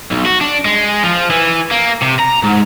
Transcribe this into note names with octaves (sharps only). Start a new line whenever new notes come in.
B1
F#4
D4
G#3
F3
E3
A#3
C3
A#5
G#2